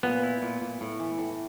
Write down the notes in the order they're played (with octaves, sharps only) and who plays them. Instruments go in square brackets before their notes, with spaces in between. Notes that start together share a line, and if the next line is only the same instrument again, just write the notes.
[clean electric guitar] A#2 [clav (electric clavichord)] B3
[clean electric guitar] E4
A#2
A#2
A2
E3
A2